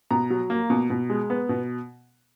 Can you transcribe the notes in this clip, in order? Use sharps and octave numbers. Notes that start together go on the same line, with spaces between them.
B2 A#5
F#3
A#3
B2
B2
G#3
B3
B2